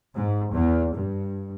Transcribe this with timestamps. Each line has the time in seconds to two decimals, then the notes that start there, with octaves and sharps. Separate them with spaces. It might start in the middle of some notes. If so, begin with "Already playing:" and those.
0.14 G#2
0.53 E2
0.93 G2